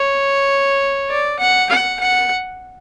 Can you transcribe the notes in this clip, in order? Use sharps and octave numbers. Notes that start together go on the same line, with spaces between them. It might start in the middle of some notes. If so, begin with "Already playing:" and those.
Already playing: C#5
D5
F#5
F#5
F#5